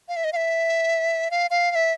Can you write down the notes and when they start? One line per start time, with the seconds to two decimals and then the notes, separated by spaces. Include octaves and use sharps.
0.09 F5
0.16 E5
0.24 D#5
0.33 F5
0.36 E5
1.31 F5
1.51 F5
1.71 F5
1.75 E5